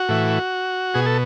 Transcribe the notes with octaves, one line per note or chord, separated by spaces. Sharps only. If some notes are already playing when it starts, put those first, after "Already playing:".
Already playing: F#4
A2 E3
B2 G#4
A4